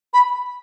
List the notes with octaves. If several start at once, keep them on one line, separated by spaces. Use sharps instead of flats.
B5